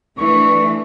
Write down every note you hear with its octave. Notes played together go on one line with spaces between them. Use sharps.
E3 A3 D4 C#6